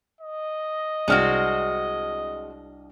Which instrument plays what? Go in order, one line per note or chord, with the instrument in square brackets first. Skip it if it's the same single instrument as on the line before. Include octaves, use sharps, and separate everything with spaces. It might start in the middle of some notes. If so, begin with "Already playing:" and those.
[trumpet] D#5
[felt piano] C2 D4 F6 [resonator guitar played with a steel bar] G#3 C4 F#4